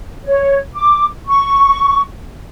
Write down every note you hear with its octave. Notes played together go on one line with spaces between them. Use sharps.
C#5
D6
C#6